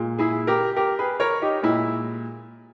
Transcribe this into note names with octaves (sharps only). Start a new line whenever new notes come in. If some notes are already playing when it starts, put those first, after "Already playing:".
Already playing: A#2 G#3
E4 G#4
G4 A#4
G4 A#4
G#4 B4
A#4 C#5
D#4 G4
A#2 G#3 E4